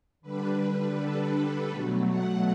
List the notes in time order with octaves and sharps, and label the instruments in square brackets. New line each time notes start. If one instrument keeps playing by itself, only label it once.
[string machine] D3 G3 D4 B4
A4
A4
B2 F#3 A3
F#5